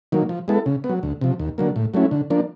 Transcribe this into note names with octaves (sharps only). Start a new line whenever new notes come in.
D#3 F#3 A#3
F3
G#3 B3 E4 A4
C#3
B3
F#3
D2
C3 F3
D#2
D3 F#3 A#3
A2
F#3 A3 C#4 E4
D3
F3 A#3 D4